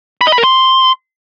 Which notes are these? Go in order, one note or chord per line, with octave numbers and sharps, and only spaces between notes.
B5
D#5
B5
A#4
C6